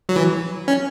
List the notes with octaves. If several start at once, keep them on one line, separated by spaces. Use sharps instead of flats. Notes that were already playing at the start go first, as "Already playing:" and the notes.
F#3
E3
C#4